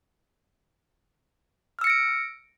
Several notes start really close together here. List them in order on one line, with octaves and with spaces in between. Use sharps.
F6 E6 C#7 A#6 D7